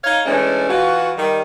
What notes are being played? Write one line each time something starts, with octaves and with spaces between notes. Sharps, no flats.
D#4 C#5 F5
E3 G#3 A3 C#4 D4
E3 F4 F#4
D#3 G3